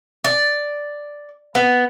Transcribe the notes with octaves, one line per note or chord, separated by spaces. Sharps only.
D5
B3